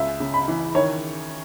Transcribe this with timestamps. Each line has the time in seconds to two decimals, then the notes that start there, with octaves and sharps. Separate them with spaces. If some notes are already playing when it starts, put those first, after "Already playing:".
Already playing: C#2 E5
0.20 C#3
0.34 B5
0.48 E3
0.75 D#3 C#5